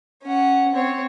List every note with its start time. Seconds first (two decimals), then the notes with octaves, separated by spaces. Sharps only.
0.23 C#4 F#5
0.74 C4 C#5